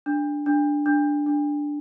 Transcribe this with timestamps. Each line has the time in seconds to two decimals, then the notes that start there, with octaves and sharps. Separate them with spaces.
0.06 D4
0.46 D4
0.86 D4
1.26 D4